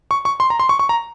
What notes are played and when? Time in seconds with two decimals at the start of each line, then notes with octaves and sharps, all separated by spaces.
0.11 C#6
0.25 C#6
0.40 C6
0.50 A#5
0.60 C6
0.69 C#6
0.79 C#6
0.89 A#5